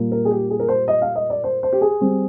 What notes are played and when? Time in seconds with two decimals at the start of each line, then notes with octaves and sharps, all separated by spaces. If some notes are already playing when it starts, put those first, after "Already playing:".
Already playing: A#2 G3 A#3
0.12 A#4
0.25 G#4
0.31 G4
0.50 G#4
0.60 A#4
0.68 C5
0.88 D#5
1.02 F5
1.16 D#5
1.30 D5
1.44 C5
1.63 C5
1.73 G4
1.81 G#4
2.01 G3 C4